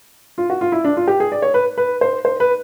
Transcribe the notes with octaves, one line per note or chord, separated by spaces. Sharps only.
F4
F#4
F4
E4
D4
F4
G4
G#4
D5
C#5
B4
B4
C5
C5
B4